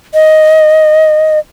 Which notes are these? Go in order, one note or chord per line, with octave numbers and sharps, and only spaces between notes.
D#5